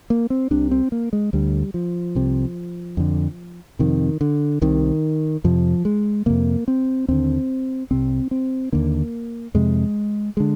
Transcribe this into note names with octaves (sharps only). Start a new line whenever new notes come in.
A#3
C4
C2 C3 D4
C4
A#3
G#3
D2 D3 G3
F3
C2 C3
F2 D3
F2 C3 D#3
D3
C2 C3 D#3
F2 C3 F3
G#3
F2 C3 A#3
C4
D#2 D3 C4
C2 C3 C4
C4
D#2 D3 A#3
F2 C3 G#3
D3 G#3